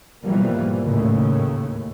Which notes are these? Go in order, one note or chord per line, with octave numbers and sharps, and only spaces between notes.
G#2 B2 E3 F3 G3 A#3
D#2 A2 C#3